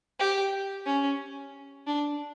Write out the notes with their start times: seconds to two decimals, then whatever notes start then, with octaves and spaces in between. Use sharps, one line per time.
0.20 G4
0.86 C#4
1.87 D4